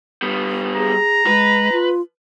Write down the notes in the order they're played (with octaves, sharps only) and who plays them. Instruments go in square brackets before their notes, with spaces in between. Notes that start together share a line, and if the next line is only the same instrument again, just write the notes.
[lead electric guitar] G3 B3
[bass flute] G#4 [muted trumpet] A#5
[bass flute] G#3 [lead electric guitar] B4
[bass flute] F4